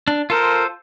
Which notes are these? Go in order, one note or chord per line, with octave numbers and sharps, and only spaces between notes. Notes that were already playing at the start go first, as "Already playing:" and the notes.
D4
F4 A4 A#4 C5